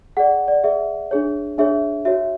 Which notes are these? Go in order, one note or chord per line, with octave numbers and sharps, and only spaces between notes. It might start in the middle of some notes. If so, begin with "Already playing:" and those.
G#4 D5 F#5
D5
G#4 D5 E5
D4 G#4 C#5
D4 G#4 C#5 E5
F#4 C#5 E5